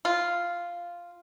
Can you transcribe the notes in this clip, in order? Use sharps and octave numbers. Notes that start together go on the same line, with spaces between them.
F4